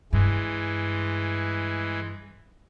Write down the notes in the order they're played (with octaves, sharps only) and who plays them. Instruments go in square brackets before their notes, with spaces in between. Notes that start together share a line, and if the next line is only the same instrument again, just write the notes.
[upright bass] G2 [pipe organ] E3 G#3